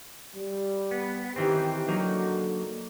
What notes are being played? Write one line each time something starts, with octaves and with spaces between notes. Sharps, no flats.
G3
B3
D#3 E3 C4 G4
D3 F#3 A#3 D#4